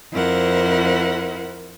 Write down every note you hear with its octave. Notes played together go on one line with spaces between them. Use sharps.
F2 E4 A#4 C5 F#5